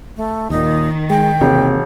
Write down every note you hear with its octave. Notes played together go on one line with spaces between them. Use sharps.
A3
D#2 A#2 D#3 D#4
G#3 G5
E1 C3 A#3